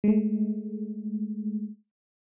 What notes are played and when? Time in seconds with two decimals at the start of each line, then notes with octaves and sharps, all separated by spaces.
0.04 G#3 A3